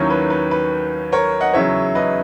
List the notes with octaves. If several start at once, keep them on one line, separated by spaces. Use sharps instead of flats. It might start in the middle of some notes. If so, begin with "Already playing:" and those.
Already playing: D#2 D#3 F#3 C#4 E4 A#4 C#5
B4
B4
B4
A#4 C#5
D#5 F#5
E2 C#3 F#3 C#5 E5
B4 D#5